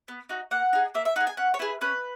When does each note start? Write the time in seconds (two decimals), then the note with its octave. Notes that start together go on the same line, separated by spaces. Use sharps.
0.08 B3
0.29 D#4 F#4
0.51 A#3 F#5
0.73 D#4 G#4
0.94 A#3 E5
1.05 E5
1.16 D#4 F#5
1.20 G#4
1.27 G#5
1.37 C#4 F#5
1.54 C#5
1.59 E4 G#4 B4
1.81 C#4 B4